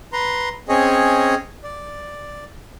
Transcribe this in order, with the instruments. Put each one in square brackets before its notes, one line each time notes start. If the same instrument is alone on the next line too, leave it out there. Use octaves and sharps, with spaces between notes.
[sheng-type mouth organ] B4 A#5 C6
C4 C#4 G#4 C#5 D#5
D5